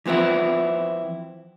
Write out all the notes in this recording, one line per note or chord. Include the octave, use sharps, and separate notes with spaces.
E3 F3 B3 C4 E4